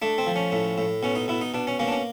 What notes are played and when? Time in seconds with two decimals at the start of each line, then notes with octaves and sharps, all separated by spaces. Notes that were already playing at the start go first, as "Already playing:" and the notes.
0.02 A3 D4
0.18 C4
0.27 F3
0.36 C#4
0.52 A2
0.78 A2
1.03 B2 C#4
1.15 D#4
1.28 B2 E4
1.41 D#4
1.54 B2 D4
1.67 C#4
1.79 A#3 C#4
1.88 D4
1.92 C#4